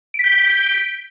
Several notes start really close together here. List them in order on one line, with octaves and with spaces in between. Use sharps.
D7 B6 G6